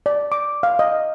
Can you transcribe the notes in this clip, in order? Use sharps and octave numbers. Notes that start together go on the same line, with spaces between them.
D5
D6
F5
D#5